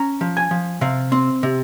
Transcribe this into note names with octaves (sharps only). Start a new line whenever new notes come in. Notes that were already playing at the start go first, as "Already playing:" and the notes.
Already playing: C#4 A#5
F3
G#5
F3
C3 F5
C4
C3